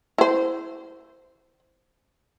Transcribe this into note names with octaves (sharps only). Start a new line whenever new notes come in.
E4 C5